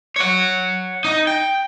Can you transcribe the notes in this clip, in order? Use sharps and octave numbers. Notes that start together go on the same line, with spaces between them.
C#5 F#5
D#4
G5